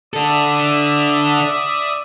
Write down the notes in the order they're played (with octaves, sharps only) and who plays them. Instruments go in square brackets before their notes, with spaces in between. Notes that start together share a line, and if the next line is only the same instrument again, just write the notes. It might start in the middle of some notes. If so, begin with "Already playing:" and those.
[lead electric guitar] D4 A4 [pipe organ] D5 E5 D#6